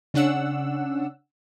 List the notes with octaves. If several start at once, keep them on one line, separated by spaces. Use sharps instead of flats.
C#3 C#4 D4 F#5 E6